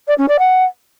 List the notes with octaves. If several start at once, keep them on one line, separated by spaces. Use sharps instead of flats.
D5
C#4
D5
F#5